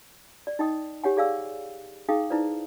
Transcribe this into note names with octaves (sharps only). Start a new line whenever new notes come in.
D5
D#4 D#5 G5 D#6
G4 C#5 F#5 G#5
G#4 D5 F5 G#5 E6
D#4 G#4 F5 G5 D#6
D#4 E4 B4 C5 D5